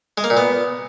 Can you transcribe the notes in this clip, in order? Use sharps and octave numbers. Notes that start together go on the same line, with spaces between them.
G#3
A#3
A#2
B3